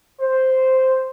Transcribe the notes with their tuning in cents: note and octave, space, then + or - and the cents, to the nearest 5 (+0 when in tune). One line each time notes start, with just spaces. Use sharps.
C5 -5